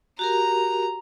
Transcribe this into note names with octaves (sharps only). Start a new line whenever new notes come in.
F#4 G4 A#4 A#5